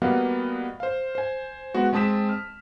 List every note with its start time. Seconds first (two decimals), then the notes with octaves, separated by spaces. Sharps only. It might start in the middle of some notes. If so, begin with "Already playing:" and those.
0.02 G3 A#3 B3 F#4 D#5 F5
0.80 C5 F5
1.15 C5 G#5
1.74 G#3 B3 F#4
1.93 G#3 C4 A5 D#6 B6 E7
2.29 F6